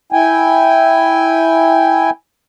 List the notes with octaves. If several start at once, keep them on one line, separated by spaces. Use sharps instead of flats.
E4 G5 G#5